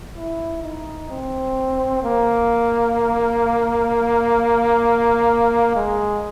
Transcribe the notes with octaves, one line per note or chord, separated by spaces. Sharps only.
E4
D#4
C4
A#3
G#3